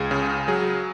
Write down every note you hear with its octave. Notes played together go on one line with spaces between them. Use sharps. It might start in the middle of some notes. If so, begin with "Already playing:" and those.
Already playing: C#2 G#4
C#3
F#3 G#4